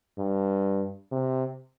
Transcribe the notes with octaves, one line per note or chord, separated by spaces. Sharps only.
G2
C3